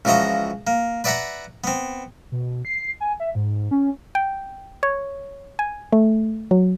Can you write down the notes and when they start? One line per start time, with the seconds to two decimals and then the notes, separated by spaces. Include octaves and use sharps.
0.05 C#2 E3 F3 F#4 D#5 A#5
0.67 A#3
1.04 B4 D5 E5 F#5 A#5 B5
1.64 B3 C4
2.32 B2
2.65 C7
3.00 G#5
3.20 E5
3.35 G#2
3.71 C#4
4.15 G5
4.83 C#5
5.59 G#5
5.92 A3
6.51 F#3